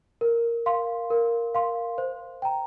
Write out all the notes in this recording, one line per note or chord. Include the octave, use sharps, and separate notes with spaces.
A#4
F5 C6
A#4
F5 C6
C5
G5 A#5